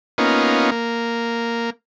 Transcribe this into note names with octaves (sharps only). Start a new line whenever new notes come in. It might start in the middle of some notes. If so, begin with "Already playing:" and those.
A#3 B3 C#4 D#4 F4
A#3